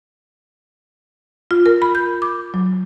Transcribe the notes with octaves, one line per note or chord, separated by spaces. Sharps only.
F4
A#4
B5
G6
D6
F#3